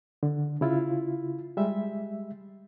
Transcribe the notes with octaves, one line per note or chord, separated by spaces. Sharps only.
D3
C#3 E4 F4
G3 G#3 E5